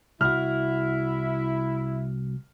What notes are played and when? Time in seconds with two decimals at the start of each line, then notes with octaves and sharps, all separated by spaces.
0.21 C2 E4 F#4 F6